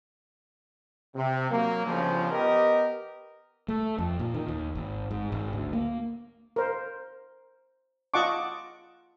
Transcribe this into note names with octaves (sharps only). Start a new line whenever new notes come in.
C3
F#3 A#3
G1 C#3 F3
B3 G4 A#4 D#5
A3
F2
A#2
D#3
D#2
G#1
G#2
G#1
D2
A#3
A#4 C5
F4 D#5 F#5 A5 C#6 D6